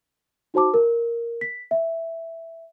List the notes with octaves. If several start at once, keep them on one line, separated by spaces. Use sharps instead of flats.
D#4 F#4 C5 A5 D6
A#4
B6
E5